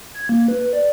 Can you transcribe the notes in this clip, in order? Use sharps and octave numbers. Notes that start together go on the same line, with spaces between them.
G#6
A#3
B4
D5